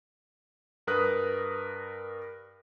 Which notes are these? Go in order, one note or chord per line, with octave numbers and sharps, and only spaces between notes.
G2 A#4 B4 D#6 F#6